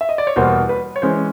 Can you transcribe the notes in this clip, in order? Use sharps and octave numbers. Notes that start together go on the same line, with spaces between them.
E5
D#5
D5
C#5
E2 B2 G3 A#3 C5
B4
C#5
E3 G#3 C#4 C5